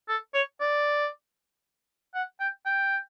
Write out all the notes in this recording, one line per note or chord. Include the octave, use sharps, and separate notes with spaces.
A4
C#5
D5
F#5
G5
G5